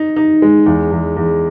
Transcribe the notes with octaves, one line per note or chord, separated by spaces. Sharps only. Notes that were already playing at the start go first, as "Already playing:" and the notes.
Already playing: D#4
D#4
G#3
E2
E2
E2